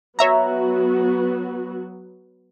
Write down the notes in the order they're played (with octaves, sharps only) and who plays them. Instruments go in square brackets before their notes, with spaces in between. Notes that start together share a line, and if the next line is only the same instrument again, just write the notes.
[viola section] F#3 B3 F#4 [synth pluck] C#5 E5 A#5